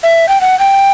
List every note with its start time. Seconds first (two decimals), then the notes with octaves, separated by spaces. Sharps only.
0.03 E5
0.28 G5
0.41 F#5
0.59 G5